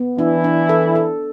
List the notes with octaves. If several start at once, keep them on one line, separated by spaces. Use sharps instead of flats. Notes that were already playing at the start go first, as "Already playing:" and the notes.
Already playing: B3
E3 D4 E4
D4
A4
A4